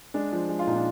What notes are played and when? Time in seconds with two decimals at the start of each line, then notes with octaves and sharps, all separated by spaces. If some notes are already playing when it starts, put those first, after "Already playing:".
0.14 G#3 D4
0.32 F3
0.49 G#3
0.59 F4
0.67 A#2 D#4
0.76 D4